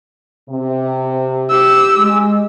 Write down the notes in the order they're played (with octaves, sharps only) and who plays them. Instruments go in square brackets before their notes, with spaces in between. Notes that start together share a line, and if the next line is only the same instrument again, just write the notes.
[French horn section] C3
[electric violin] G4 E6
[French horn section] G#3